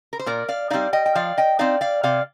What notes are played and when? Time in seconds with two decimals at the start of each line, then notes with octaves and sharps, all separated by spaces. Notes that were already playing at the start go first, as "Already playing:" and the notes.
0.13 A#4
0.19 C5
0.26 A#2 A#4 D5
0.49 D5 F5
0.70 G3 C4 D#4 D5 F5
0.93 D#5 G5
1.06 G5
1.15 F3 D5 F5
1.38 D#5 G5
1.59 C4 D#4 D5 F5
1.81 D5 F5
2.03 C3 D5 F5